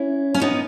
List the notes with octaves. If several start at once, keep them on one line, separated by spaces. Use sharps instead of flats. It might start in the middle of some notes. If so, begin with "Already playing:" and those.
Already playing: C#4 E4
C#4
B3 D#4